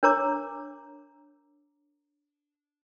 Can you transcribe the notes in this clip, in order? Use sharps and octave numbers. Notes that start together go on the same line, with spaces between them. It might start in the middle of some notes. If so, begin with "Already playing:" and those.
D4 A#4 C#5 A#5 D6